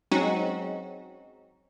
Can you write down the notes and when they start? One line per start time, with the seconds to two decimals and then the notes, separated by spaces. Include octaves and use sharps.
0.11 F#3 G#3 C4 C#4 D#4 F#4